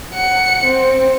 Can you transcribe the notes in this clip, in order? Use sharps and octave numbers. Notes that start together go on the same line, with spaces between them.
F#5 C#7
C4